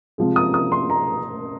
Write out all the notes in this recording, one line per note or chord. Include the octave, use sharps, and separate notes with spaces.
C3 F3 G#3
D#6
D#6
C6
A#5